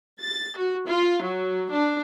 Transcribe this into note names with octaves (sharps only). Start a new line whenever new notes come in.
A6
F#4
F4
F#3
D4